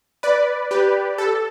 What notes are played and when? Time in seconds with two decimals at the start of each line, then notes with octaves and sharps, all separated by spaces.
0.23 B4 D5
0.71 G4 B4
1.18 A4